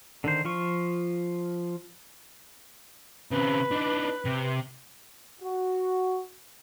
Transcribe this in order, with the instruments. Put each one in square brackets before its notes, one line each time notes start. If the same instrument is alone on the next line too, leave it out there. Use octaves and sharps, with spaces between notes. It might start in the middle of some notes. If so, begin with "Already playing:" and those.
[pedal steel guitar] D3 D#3 C5
F3 F4 C#6
[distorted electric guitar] C#3 C4 [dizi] B4
[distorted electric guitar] D4 D#4
C3
[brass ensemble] F#4